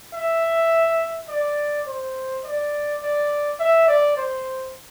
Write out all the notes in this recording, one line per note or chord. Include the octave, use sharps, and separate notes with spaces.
E5
D5
C5
D5
D5
E5
D5
C5